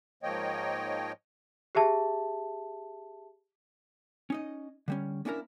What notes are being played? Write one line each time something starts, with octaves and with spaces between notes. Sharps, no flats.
G#2 F3 A#3 C#5 D#5 G5
G4 G#4 E5 A5
C#4 D#4 D#5
D3 G3 C#4
A#3 C#4 D4 E4 A4 A#4